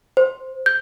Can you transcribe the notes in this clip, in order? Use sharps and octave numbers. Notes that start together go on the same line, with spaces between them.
C5
G6